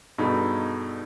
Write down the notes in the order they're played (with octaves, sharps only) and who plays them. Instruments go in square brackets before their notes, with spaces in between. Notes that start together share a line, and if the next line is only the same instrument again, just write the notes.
[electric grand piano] G2 B2 D#4 G#4 A4 B5